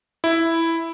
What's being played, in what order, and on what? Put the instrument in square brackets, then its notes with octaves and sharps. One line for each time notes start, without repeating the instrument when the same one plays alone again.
[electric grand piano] E4